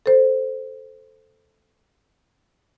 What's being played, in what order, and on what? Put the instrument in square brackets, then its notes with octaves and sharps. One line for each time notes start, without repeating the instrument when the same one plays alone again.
[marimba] A4 C5